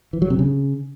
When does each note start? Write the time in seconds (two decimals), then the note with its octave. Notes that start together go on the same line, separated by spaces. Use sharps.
0.13 E3
0.22 F#3
0.30 C3
0.39 C#3